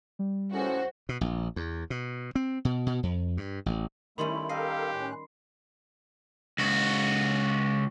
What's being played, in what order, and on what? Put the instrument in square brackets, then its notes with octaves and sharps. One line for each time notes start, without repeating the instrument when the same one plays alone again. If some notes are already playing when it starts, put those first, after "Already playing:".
[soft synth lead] G3
[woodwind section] C#2 A2 C#4 [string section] F#4 C5
[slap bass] B2
A#1
E2
B2
C4
B2
B2
F2
G2
A1
[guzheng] D#3 G3 C#4 [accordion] A3 E4 [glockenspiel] B5 C6
[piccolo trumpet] G4 [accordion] A4 A#4 F5 [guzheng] D#5 [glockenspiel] C7
[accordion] A2 C#4 F#6
[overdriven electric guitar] C#2 F#4